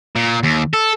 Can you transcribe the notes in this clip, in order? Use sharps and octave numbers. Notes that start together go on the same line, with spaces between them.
A#2
D#2
A4